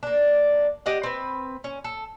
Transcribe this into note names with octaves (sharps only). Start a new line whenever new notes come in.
A#3 D4
G4 D#5 F#5
C4 B4
C#4
A4